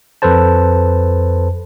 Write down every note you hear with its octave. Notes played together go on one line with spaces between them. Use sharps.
F2 A4 B4 C5 A5